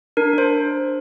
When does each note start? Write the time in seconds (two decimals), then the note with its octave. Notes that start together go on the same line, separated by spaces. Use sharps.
0.17 D4 A#4
0.33 D4 C5